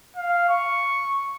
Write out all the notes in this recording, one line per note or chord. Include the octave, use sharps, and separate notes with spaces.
F5
C#6